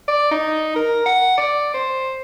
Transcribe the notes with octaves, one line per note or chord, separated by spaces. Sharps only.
D5
D#4
A#4
F#5
D5
C5